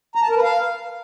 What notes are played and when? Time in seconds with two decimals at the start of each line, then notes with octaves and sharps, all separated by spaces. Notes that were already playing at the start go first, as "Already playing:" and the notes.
0.15 A#5
0.22 A5
0.29 A#4
0.36 B4
0.43 F5